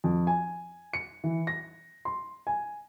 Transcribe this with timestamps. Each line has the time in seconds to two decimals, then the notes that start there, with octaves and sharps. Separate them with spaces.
0.04 F2
0.27 G#5
0.94 C#7
1.24 E3
1.47 A#6
2.05 C6
2.47 G#5